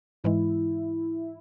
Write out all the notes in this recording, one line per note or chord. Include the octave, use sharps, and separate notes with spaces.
G#2 E3 G#3 E4